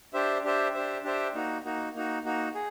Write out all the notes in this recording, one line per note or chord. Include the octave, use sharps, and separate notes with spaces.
D4 G4 C5 E5
D4 G4 C5 E5
D4 G4 C5 E5
D4 G4 C5 E5
A#3 D#4 F#4
A#3 D#4 F#4
A#3 D#4 F#4
A#3 D#4 F#4
G#4